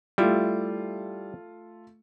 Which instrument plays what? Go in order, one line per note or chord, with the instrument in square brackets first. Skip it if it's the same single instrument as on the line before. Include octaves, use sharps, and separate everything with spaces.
[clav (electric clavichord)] G3 E4 [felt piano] A3 F4